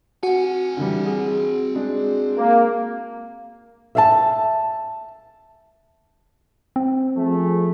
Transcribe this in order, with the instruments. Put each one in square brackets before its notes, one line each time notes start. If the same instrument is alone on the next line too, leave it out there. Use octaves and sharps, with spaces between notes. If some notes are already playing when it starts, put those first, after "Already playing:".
[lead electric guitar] C4 G#5 [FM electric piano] F#4
[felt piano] D3 E3 G3
G#4
G#3 D4
[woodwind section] A#3
[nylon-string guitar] E5 F5 A5
[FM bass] C4
[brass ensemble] F3 A3 G#4